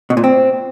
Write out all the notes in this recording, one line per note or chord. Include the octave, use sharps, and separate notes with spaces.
B2
A#2
C4